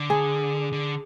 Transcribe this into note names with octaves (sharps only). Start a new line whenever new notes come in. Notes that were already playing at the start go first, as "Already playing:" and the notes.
Already playing: D3
G#4
D3